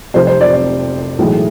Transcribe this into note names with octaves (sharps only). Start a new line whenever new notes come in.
F1 F2 C3 C5
C5
D5
D5
B1 A2 E3 G#3